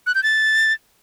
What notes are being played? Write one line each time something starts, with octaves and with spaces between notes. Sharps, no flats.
F#6
G6
A6